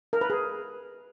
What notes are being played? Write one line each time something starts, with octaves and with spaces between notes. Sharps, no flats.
A#4
B4
G#4